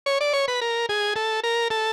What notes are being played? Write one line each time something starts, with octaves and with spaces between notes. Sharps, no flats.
C#5
D5
C#5
B4
A#4
G#4
A4
A#4
A4